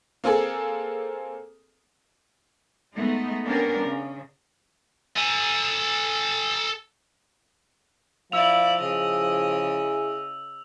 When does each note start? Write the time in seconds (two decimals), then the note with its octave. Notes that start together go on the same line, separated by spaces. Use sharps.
0.24 A#3 C4 G#4 A4
2.95 G#3 A3 B3 D#4
3.44 A#3 B3 C#4 D4 G4 A#4
3.81 C#3
5.17 A4 G#5
8.32 F3 E4 D5 F5 E6 F7
8.81 C#3 E4 G#4 D#5